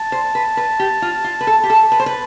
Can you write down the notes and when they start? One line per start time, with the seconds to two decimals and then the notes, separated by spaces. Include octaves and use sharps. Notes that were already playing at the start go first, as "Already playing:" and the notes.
Already playing: A5
0.12 C5
0.35 B4
0.57 B4
0.80 G4
1.02 F4
1.24 F4
1.41 B4
1.47 A4
1.63 G4
1.70 A4
1.92 B4
2.00 C5
2.06 B4